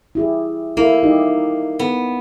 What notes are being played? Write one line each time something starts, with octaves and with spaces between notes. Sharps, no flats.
E4 G4 G#4
A#3 E4 A4
D#4 G4 D#5
B3